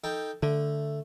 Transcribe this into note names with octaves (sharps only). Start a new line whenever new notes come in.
D#4 A4 G5
D3 A3